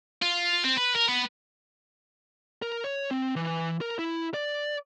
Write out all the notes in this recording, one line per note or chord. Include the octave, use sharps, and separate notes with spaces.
F4
C4
B4
A#4
B3
A#4
C#5
C4
E3
A#4
E4
D5